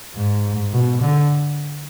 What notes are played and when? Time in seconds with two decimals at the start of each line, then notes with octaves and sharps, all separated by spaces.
0.16 G#2
0.73 B2
1.02 D3